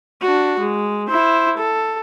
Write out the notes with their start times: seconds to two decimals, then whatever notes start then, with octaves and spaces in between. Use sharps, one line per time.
0.22 D4 F#4
0.60 G#3
1.08 E4 C5
1.58 A4